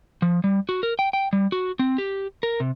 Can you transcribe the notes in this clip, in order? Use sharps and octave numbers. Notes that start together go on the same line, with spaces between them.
F3
G3
F#4
A#4
G5
G5
G3
F#4
C4
G4
A#4
C3